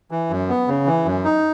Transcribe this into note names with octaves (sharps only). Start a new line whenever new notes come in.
E3
F#2
B3
C#3
E3
F#2
D#4